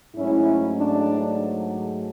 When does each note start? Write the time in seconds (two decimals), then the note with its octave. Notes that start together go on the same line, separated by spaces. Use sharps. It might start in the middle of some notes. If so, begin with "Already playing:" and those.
0.15 G#2 F#3 A3 C#4 E4
0.77 D4